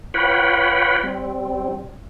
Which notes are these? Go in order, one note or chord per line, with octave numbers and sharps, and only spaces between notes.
F4 B4 C#5 F#5 G5 B5
G3 C4